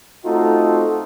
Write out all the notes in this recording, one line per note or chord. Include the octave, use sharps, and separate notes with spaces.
A3 C4 D#4 F4 F#4 A4